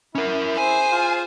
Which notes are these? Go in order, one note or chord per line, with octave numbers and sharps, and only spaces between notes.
C#4 E4 A#4
G#4 C5 G#5
F4